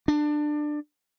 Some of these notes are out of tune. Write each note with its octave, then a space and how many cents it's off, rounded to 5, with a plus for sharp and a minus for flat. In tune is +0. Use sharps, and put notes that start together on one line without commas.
D4 +20